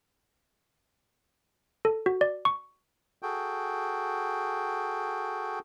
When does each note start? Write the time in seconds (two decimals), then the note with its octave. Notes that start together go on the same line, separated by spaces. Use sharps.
1.85 A4
2.06 F#4
2.21 D5
2.45 C#6
3.22 F#4 G#4 A4 G5